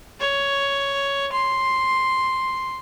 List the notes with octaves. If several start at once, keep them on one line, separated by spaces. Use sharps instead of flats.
C#5
C6